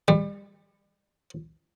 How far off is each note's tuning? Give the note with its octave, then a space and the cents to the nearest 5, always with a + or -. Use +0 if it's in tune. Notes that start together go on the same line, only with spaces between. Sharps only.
G3 +35